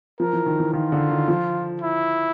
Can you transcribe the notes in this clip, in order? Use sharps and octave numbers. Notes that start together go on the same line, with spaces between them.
F3 A#4
E3
D#3
E3
D#3 F4
D3
D#3
F3
E4